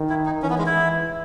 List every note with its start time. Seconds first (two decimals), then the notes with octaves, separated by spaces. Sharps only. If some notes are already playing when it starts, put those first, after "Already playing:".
Already playing: D#3
0.10 E4
0.26 D#4
0.42 E3 C#4
0.50 B3
0.58 G#3
0.66 E4